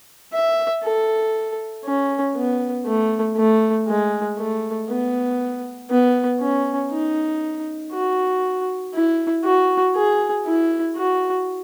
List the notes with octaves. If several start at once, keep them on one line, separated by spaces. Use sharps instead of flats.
E5
A4
C#4
B3
A3
A3
G#3
A3
B3
B3
C#4
D#4
F#4
E4
F#4
G#4
E4
F#4